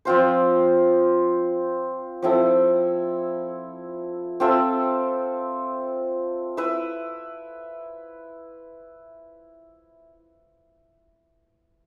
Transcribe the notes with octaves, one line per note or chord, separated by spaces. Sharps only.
F3 C4 F4 C5
F3 C4 E4 A4
C4 F4 A4 E5
E4 B4 E5